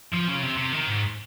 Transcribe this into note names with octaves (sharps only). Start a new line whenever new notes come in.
F3
C#3
C3
C3
D#3
G#2